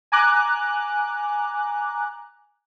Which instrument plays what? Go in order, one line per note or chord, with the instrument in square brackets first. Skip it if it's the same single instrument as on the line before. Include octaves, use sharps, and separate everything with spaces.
[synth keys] G#5 A#5 D6 F#6